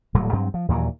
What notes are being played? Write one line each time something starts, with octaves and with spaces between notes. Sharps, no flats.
D#1 A2 F#3 G3
G2 F#3 C4
F3
D#2 A#2 E3 F#3